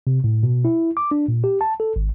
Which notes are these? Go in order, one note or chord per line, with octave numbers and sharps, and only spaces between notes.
C3
A2
B2
E4
D6
D4
A#2
G4
A5
A4
G#1